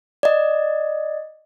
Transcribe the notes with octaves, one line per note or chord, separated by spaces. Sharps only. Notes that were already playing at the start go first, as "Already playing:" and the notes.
D5 D#5